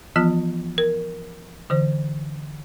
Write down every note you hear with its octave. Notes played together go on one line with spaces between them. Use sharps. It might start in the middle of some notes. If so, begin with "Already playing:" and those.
E3 F3 B3 F4
A#4
D3 E3 C5